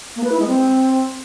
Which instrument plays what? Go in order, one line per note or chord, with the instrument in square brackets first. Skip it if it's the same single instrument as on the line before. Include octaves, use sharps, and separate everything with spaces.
[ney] A#3
B4
E4
G#3
C4